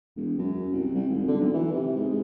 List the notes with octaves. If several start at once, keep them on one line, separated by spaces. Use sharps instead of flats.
E1
F#2
C2
C2
G#1
D3
B1
E3
C3
G#2
G#2